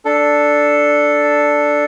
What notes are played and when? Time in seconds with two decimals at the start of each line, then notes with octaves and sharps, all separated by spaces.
0.05 D4 A4